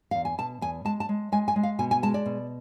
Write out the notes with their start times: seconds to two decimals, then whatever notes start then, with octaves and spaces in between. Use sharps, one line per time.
0.11 E2 F5
0.25 G#5
0.38 B2 A5
0.61 E2 G#5
0.85 G#3 A5
1.00 A5
1.09 G#3
1.32 G#3 G#5
1.48 G#5
1.56 G#3
1.63 F5
1.79 B2 G#5
1.91 G#5
2.03 G#3 A5
2.14 D5
2.26 B2